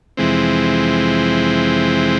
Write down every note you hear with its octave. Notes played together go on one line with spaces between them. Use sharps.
F2 C3 E3 G#3 C4